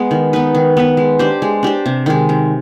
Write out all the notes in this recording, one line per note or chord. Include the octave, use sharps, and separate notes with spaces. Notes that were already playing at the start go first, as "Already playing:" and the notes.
Already playing: G#3 B3
D#3
B3 D#4 B4
D#3
B3 D#4 B4
G#3
D4 G4 C5
G#3
D4 G4 C5
C3
D#3 G#3
C3